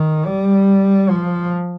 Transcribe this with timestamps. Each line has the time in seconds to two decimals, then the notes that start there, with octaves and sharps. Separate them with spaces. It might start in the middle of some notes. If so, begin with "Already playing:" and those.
Already playing: D#3
0.26 G3
1.09 F3